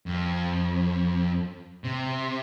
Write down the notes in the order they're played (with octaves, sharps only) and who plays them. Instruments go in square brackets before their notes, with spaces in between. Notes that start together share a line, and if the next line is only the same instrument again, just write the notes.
[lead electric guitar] F2
C3